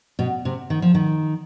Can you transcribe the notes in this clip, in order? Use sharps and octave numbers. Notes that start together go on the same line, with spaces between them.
B2
C3
D#3
F3
D#3